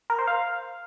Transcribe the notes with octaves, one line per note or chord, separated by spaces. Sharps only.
A#4
C5
F5